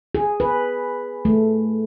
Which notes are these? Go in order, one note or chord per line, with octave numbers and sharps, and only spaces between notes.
G#4
B4
A3